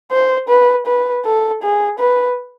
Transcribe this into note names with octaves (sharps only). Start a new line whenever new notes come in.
C5
B4
B4
A4
G#4
B4